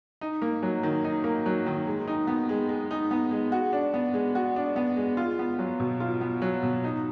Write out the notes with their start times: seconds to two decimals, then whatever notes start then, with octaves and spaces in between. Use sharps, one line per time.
0.21 D#4
0.42 A#3
0.63 F#3
0.83 D#3
1.04 D#4
1.24 A#3
1.46 F#3
1.66 D#3
1.87 G#3
2.08 D#4
2.27 B3
2.49 G#3
2.69 G#3
2.91 D#4
3.11 B3
3.31 G#3
3.52 F#4
3.73 D4
3.94 B3
4.14 G#3
4.35 F#4
4.56 D4
4.76 B3
4.96 G#3
5.17 F4
5.39 B3
5.59 F#3
5.80 B2
6.00 F4
6.21 B3
6.42 F#3
6.63 B2
6.84 D#4